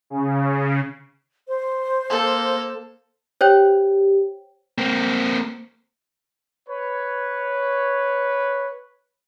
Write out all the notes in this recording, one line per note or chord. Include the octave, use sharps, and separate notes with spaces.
C#3
C5
A#3 A4
G4 C5 C#5 G5
A#3 C4
B4 C#5